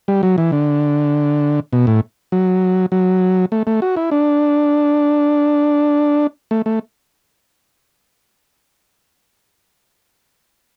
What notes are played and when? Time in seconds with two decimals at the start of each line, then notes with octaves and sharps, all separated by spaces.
0.08 G3
0.23 F#3
0.38 E3
0.52 D3
1.73 B2
1.87 A2
2.32 F#3
2.92 F#3
3.52 A3
3.67 A3
3.82 F#4
3.97 E4
4.11 D4
6.51 A3
6.66 A3